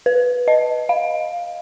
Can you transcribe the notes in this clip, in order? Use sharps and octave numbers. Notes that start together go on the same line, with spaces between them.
B4
D#5
F5